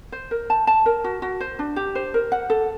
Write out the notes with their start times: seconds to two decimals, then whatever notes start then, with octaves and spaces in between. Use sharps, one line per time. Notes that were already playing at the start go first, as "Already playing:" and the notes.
0.12 C5
0.31 A#4
0.50 A5
0.67 A5
0.86 A#4
1.04 F#4
1.22 F#4
1.40 C5
1.59 D4
1.76 G4
1.95 C5
2.14 A#4
2.32 F#5
2.50 A4